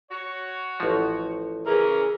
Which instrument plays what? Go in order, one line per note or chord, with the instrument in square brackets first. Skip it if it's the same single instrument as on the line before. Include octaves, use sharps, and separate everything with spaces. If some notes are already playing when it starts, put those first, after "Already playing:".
[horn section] F#4 C#5
[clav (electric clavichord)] A1 F3
[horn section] C#3 E3 C#4 [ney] G#4 [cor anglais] A#4